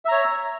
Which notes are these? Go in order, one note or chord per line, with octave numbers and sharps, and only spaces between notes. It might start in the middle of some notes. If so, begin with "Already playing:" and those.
C#5 E5 A#5